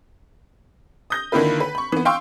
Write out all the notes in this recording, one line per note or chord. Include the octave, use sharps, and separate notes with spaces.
D#6 G6 A#6
D3 D#3 A#3 E4 F4 B4
B4
B5 C#6
E3 B3
F5 G5 C6 C#6 E6